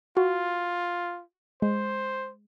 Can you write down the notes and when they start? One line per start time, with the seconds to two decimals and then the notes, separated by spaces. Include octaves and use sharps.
0.17 F4 F#4
1.62 G#3 C5